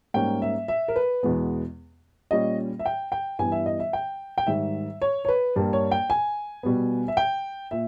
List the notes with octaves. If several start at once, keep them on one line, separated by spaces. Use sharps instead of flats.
G#2 G3 A#3 C#4 G5
E5
E5
A#4
B4
E2 B2 G#3 B3
A#2 G3 C#4 D#5
E5
G5
G5
G2 E3 G3 B3 G#5
E5
D#5
E5
G5
G5
G#2 D#3 G3 E5
C#5
C#5
B4
G2 G3 A#3
C#5
G5
G#5
B2 G3 B3
E5
G5
A#2 E5